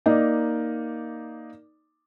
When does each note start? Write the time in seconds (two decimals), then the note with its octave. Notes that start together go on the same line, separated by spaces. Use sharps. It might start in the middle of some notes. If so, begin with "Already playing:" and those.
0.06 A#3 D#4 D5 D#5